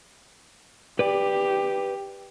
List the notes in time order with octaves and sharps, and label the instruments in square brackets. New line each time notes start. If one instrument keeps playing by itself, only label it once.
[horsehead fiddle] G4 [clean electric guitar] B4 D5